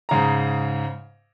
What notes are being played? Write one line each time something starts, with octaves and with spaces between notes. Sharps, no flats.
G#2 C#3 A#5